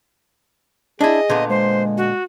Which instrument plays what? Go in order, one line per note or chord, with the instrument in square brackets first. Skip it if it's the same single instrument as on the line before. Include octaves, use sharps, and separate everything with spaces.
[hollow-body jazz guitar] D4 E4 [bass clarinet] G#4 [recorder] D#5
[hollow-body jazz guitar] A#2 D3 B3
[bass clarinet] G#3 [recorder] C5
[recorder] F#4